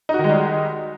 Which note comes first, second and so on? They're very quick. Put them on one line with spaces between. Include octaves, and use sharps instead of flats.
D#4 F#4 D#3 G#3 G3